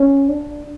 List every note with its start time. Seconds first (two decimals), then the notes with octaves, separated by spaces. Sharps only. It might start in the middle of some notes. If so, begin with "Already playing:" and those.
Already playing: C#4
0.29 D4